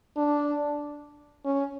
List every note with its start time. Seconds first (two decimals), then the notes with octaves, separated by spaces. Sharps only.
0.17 D4
1.45 C#4